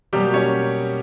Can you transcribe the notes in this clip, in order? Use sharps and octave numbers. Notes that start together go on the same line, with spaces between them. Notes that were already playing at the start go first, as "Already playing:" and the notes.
B2 F#3 G3 A#3 G4
C#4 C#5